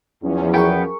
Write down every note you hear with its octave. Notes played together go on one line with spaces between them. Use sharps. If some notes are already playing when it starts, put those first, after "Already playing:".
E2 F3 F#3 C#4
B3 G#4 A#4 G5 C#6